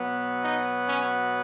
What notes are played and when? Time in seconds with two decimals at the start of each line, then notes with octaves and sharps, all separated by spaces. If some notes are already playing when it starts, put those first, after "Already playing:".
Already playing: B2 F#3 B3
0.43 D#4
0.88 C#4